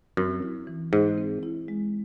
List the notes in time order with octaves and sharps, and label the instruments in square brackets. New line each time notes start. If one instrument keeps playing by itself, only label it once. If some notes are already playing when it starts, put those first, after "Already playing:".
[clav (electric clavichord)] F#2 [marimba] C4
[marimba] E4
E3
[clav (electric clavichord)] G#2 [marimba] G#4
[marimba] C4
E4
G#3